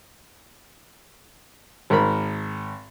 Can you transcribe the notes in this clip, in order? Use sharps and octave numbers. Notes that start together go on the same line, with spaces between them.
G#1 A#4 B5